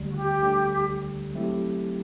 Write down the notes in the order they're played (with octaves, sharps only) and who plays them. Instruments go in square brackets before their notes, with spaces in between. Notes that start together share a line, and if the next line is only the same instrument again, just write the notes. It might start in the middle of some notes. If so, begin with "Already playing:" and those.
Already playing: [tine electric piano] D2 D3 G3
[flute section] F#4
G4
[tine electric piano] D2 D3 G3
F#3 A3 C4 E4 G4